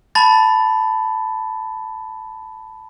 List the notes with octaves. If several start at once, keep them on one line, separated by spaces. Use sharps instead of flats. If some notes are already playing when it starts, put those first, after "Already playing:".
A5 B5 A6